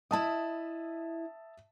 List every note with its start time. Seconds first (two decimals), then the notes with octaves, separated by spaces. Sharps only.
0.11 E4 D#5 E5 A5 D#6